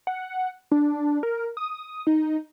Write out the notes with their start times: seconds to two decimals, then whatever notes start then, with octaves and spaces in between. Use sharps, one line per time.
0.07 F#5
0.72 D4
1.23 A#4
1.57 D#6
2.07 D#4